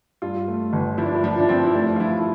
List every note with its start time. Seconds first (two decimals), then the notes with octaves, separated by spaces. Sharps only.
0.22 G2 F4
0.48 A3
0.73 G1
0.98 F3 E4
1.06 D4
1.15 E4
1.24 F3 D4
1.40 D4
1.49 F3 C4
1.64 E4
1.75 A3 D4
1.96 F4
2.00 F3 E4
2.17 E4